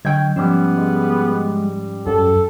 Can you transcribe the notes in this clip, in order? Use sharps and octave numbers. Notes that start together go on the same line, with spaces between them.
D3 F#3 D#5 G5 G#6
G#2 F3 G3 B3 C#4
G#3
F#2 A4